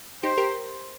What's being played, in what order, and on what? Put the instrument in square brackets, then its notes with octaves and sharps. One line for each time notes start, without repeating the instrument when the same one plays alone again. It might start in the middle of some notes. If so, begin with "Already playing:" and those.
[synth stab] D#4 G4 [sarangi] C5
[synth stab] G4 A#4